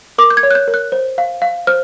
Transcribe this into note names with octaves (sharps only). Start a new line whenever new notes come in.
A#4 D6
G6
G#6
C#5
F#6
G6
A#4
F#6
C5
F5
F5
C5 F6